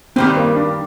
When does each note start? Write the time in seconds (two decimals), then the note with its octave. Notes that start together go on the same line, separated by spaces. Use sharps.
0.16 G2 D#3 G3 C4
0.37 A#3
0.56 D4